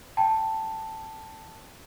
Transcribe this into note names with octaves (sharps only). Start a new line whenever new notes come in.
G5 A5